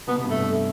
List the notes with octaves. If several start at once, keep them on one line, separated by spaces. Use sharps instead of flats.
B2 B3
C3
G2 B2
A3